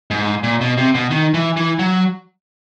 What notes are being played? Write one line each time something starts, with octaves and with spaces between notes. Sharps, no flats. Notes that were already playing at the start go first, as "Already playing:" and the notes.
G#2
A#2
B2
C3
B2
D#3
E3
E3
F#3